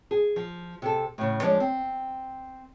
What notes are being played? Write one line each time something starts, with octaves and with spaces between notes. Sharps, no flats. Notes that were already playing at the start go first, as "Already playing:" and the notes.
G#4
F3
C3 A4
A2 C#3
F3 G#3 D4 C#5 D5
C4